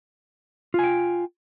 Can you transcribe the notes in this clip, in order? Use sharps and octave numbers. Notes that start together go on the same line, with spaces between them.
F4 G5 G#5